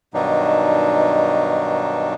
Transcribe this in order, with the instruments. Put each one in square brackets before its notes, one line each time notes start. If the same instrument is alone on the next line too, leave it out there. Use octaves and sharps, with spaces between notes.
[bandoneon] G2 B2 D#3 F#3 D4 D#4